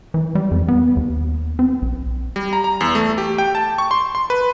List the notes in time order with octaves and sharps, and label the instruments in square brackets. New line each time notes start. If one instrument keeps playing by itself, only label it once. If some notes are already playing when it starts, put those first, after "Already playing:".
[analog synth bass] E3
G3
F2
B3
D#2
C4
B1
[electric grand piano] G3
A#5
A#5
E2
A3
G4
G5
A5
C#6
C6
C6
B4